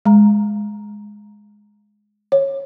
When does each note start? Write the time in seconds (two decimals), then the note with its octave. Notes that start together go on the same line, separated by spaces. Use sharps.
0.06 G#3 A#5
2.32 C#5